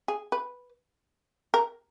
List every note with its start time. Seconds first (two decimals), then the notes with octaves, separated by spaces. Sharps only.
0.08 G#4
0.32 B4
1.54 A#4